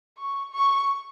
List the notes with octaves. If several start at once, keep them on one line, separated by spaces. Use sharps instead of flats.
C#6
C#6